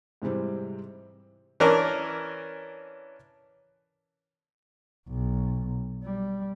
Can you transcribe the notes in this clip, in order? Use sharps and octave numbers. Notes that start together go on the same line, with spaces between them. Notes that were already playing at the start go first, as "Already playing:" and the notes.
G#2 C3 E3 G3 C4
E3 C#4 D4 A#4
B1
G3